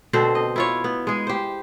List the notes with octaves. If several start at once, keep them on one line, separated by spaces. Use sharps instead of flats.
B2 D3 C4 C5
D#5
E4 F4 C#5
B3
G#3 G#4
G4 C5